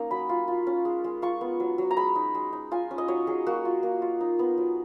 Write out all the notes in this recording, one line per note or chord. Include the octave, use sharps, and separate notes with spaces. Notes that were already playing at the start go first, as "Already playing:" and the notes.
Already playing: A#3 C#4 D#4 G#5
F#3 B5
F4
F4
C#4
G#3
G#3
F4 C#6
B3
F#3
F#3
A#5
G#3 B5
D#4
G#3
D#4
F4 G#5
C#4
D#5
F#3 C#5
F#3 G#4
A#3 F#4
F4
A#3
F4
D#4
B3
F#3